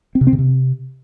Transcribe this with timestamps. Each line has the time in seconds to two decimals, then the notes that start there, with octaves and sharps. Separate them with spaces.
0.15 C4
0.21 C3
0.27 C4
0.33 C#3
0.39 C3